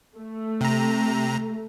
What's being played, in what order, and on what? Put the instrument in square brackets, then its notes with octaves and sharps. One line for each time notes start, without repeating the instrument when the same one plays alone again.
[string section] A3
[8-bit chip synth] C3 A#5